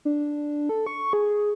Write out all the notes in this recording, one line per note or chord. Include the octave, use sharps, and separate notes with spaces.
D4
A4
C#6
G#4